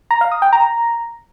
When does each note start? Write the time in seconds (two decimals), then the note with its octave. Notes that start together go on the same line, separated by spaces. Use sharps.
0.11 A#5
0.21 F5
0.32 D#6
0.42 G5
0.53 A#5